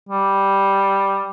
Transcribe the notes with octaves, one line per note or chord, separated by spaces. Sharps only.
G3